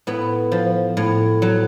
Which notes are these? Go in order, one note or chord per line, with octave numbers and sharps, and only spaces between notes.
A2 B3
F3
A2
F#3